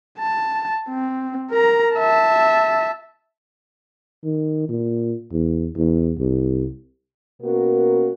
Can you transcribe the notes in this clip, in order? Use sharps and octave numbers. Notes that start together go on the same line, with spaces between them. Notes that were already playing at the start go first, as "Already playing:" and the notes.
A5
C4
A#4 A#5
E5 A5
D#3
A#2
E2
E2
C2
B2 A#3 C#4 F#4 A#4